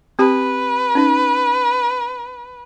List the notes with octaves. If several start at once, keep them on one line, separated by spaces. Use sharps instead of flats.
C4 G4 B4 A5
C#4 D#4